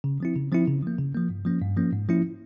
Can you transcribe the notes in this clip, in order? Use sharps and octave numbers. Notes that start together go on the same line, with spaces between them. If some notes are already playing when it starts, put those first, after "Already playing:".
C#3
F3 C4 E4
C#3
F3 C4 E4
C#3
F3 A#3
C#3
F3 A#3
G2
F3 A#3 C#4
G2
F3 A#3 C#4
G#2
F3 A#3 C#4 E4